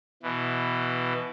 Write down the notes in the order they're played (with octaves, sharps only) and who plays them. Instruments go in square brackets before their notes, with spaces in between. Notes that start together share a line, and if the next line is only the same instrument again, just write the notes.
[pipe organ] B2 E3